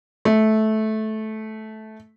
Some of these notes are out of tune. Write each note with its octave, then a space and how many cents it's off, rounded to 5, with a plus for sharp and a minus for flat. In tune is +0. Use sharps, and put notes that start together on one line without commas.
A3 -15